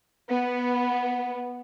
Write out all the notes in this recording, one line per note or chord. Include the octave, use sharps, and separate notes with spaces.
B3